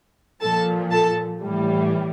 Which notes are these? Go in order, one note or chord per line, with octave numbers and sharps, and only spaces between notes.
A#2 F3 A4 A5
A4 A5
A2 E3 G3